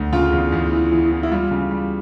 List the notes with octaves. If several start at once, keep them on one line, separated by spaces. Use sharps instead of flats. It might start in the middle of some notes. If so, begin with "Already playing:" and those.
Already playing: D2
C#3 F4
E2
E2
E3
E3
E3
E4
G3 F4
C#3
G3